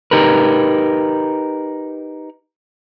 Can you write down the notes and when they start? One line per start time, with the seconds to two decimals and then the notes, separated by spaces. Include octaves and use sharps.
0.11 D#4 G4 A#4 B4